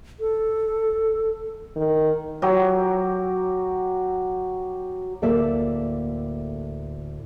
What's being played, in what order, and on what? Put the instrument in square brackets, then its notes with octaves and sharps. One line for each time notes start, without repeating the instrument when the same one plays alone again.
[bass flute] A4
[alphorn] D#3
[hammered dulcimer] F#3 G4
[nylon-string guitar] D2 A2 A#3 A4 D5 E5